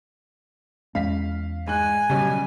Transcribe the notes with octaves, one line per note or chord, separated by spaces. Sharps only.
E2 G#3 C#4 F5 B6
G#2 G#5 F#6
B1 C#3 G3 C#4